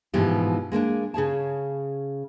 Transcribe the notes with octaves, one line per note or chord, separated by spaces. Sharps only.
G#2 B2 E3 F3 G4
G#3 A#3 C#4 D4
C#3 G#4 C#5 A5